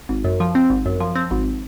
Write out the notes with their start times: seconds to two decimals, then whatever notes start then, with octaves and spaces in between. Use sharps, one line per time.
0.09 G#1
0.24 F#2
0.40 F3
0.55 C4
0.70 G#1
0.86 F#2
1.00 F3
1.15 C4
1.31 G#1